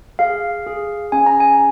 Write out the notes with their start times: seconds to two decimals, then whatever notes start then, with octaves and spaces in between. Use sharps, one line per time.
0.19 G#4 F5
0.66 G#4
1.12 C#4 G#5
1.26 A#5
1.40 G#5